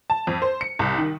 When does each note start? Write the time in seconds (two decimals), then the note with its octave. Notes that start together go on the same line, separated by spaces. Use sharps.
0.10 A5
0.27 F2
0.42 C5
0.61 C#7
0.79 C2
0.98 D#3